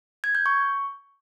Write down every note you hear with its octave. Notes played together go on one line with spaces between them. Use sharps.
G#6
G6
C#6